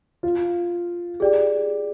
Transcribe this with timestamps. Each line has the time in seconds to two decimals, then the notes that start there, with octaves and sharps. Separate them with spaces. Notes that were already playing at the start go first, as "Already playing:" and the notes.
0.23 F4
1.20 G4 G#4 D5 G5